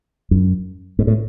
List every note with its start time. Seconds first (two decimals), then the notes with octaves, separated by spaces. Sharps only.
0.31 F#2
0.99 G#2
1.07 A2